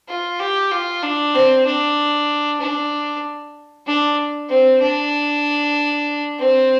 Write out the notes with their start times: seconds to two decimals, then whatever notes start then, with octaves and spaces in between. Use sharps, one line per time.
0.08 F4
0.40 G4
0.72 F4
1.03 D4
1.34 C4
1.66 D4
2.61 D4
3.87 D4
4.49 C4
4.81 D4
6.39 C4